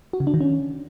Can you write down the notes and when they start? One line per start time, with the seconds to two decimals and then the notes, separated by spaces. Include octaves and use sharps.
0.13 F#4
0.20 C#3
0.27 D4
0.34 D#3
0.41 C#4